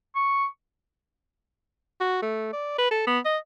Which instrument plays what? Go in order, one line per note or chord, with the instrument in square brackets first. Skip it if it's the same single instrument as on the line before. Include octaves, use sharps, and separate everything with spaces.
[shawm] C#6
[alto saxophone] F#4
A3
D5
B4
A4
B3
D#5